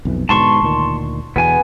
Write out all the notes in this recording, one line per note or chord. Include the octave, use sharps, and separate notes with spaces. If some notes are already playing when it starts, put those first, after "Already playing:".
B1 F2 E3
G#2 B2 D3 A5 C6 C#6
D2 A#2 D#3
E2 B2 D3 B3 G#5